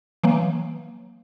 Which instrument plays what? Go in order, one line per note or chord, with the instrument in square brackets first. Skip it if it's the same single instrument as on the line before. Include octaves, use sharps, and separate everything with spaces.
[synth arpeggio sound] E3 F#3 A#3